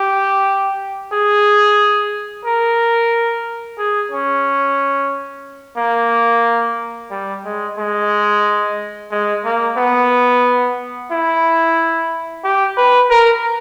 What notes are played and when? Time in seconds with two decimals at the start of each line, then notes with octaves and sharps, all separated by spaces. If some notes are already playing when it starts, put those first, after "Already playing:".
Already playing: G4
1.12 G#4
2.45 A#4
3.78 G#4
4.11 C#4
5.78 A#3
7.11 G3
7.45 G#3
7.78 G#3
9.11 G#3
9.45 A#3
9.77 B3
11.11 E4
12.44 G4
12.77 B4
13.10 A#4